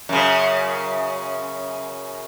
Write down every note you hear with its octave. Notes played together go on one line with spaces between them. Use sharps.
F#2 C#3